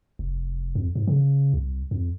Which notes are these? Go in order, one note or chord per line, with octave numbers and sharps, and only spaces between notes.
F1
F2
G#2
C#3
C2
F2